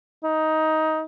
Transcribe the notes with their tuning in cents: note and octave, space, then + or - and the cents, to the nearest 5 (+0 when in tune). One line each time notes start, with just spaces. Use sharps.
D#4 +15